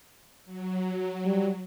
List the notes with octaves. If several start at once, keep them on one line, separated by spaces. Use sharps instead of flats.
F#3
G3